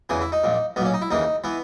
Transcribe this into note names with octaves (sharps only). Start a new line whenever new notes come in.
E2 C#3 E3 G#4
E4
D#4
A#1 A#2
B1 A#2 B3 C#4
D#4
E4
D#2 C#3 E3 D#4
E3 B3